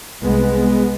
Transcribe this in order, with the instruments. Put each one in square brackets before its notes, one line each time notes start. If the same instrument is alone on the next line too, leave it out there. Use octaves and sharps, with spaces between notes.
[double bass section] C2 C3 G#3 B3